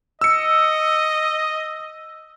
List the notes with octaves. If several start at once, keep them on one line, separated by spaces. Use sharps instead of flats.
D#5 E6 C#7